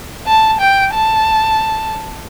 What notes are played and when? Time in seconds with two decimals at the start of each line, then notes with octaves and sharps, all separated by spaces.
0.27 A5
0.60 G5
0.94 A5